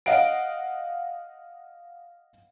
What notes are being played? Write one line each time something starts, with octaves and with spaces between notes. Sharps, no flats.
D#5 F5 F#5 D7